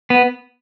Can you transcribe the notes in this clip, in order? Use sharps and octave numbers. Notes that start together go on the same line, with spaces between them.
B3